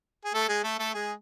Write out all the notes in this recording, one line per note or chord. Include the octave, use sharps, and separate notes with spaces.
G#4
A3 A4
G#3 G#4
A3 A4
A3 A4
G#3 G#4